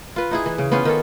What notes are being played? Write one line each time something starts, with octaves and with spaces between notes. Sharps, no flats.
F4 B4
D#4 E4 G#4
E3
C#3
B3 C#4 F4 C5
D#3 C#4 A4